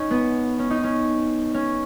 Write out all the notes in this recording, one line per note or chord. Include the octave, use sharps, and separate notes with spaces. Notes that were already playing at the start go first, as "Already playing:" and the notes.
Already playing: C#4 D#4
B3
C#4
D#4
C#4
C#4